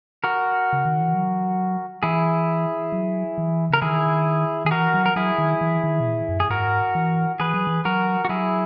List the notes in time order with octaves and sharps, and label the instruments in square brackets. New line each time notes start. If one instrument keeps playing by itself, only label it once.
[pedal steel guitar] F#4 A#4
[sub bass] C#3
D#3
E3
F#3
[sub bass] E3 [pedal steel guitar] E4 G#4
[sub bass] F#3
E3
[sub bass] C#3 [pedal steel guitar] A#4
[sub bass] D#3 [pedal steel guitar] E4 G#4
[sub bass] D#3 [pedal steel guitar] G#4
[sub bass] E3 [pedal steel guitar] F#4 A#4
[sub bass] F#3
[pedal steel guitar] A#4
[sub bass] F#3 [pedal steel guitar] E4 G#4
[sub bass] D#3
E3
D#3
B2
A#2
F#2
[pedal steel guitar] G#4
[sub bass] G#2 [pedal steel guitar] F#4 A#4
[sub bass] E3
[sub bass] E3 [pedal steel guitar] G#4 B4
[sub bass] F#3
E3
[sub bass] F#3 [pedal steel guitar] F#4 A#4
[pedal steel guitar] F#4
[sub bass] F#3 [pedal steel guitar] E4 G#4